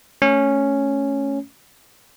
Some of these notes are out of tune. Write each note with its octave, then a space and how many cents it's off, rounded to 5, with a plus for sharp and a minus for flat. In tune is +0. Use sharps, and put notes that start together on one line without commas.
A3 +0 C#4 +0